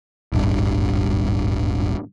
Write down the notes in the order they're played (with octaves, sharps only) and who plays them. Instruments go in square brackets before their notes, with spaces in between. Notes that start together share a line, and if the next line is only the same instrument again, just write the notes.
[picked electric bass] D#1 G#1 G2